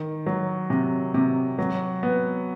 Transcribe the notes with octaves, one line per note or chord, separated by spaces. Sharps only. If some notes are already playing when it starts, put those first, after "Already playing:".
Already playing: D#3
F#3
C3
C3
F#3
B3